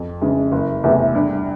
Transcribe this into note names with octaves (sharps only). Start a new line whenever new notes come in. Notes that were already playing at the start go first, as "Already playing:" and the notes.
Already playing: F2
C#3 E3 G#3
F#1
E2 C3 E3 A3
G2